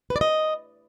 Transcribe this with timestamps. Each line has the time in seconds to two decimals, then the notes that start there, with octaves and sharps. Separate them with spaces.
0.10 B4
0.16 D5
0.21 D#5